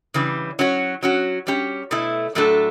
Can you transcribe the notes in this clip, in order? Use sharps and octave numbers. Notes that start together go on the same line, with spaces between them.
C#3 E3 G3 D4
F#3 C#4 F#4 C#5
F#3 C#4 F#4
G3 C#4 G4
B2 A3 E4
A2 F#3 A3 D4 A4